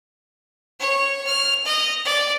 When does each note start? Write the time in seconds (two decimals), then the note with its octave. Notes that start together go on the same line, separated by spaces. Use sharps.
0.80 C#5
1.27 F6
1.65 D#5
2.05 D5